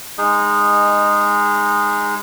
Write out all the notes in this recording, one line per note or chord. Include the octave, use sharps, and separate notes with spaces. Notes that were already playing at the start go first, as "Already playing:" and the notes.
G#3 D#4 G#4